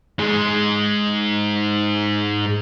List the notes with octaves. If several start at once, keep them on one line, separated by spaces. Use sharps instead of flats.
G#2 G#3